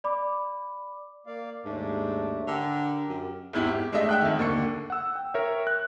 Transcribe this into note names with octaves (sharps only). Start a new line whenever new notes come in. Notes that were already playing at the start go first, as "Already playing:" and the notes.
D5 B5 D6
A#3 D5 F5
D#2 G#2 A3 D4
D3 G4 A#4
F#2
G#1 E2 E4 G4
G4
G#3 A3 D4 D#5 E5
E5 F#5 G5 E6 F#6
F2 D#3
D#2 D3 A#3 C#6 C#7
F#5 E6
G5
A#4 C#5 E5 G5
F#6